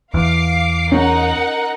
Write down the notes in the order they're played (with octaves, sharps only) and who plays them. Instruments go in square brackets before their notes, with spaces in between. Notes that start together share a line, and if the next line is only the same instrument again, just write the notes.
[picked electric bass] E2 [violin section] F5 D6 C7
[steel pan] C#4 [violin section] D#4 A#4 F#5